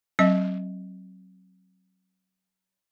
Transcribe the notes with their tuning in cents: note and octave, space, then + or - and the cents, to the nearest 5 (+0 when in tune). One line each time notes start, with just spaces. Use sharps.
F#3 +20 C4 +30 D#5 +0